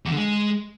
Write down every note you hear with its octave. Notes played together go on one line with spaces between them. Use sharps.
E2
D3
G#3